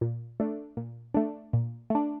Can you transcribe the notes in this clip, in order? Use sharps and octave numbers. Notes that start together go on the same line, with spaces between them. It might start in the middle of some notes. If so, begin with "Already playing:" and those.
A#2
A3 D4
A#2
A3 D4
A#2
A3 D4